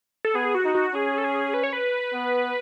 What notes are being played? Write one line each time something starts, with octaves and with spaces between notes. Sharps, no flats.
A4
B3 G#4
F#4
D#4
F#4
C#4 G#4
A4
G#4
B4
C#5
B4
B3